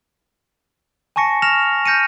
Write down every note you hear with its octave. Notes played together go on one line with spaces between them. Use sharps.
G#5 A5 C#6 A#6 C#7
F6 A#6 E7 F7
F6 G6 A#6 C#7 D#7